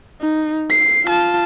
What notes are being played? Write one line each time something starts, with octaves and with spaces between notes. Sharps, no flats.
D#4
C7
F4 A5